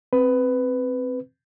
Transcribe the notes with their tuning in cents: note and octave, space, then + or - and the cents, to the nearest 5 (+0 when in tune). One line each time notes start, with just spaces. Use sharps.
C4 +0 B4 +15